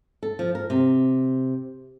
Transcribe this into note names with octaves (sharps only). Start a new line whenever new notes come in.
A4
F3
A#4
C3